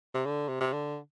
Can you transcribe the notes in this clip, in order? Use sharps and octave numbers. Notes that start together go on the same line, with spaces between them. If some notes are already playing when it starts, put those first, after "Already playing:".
C3
D3
C3
C3
D3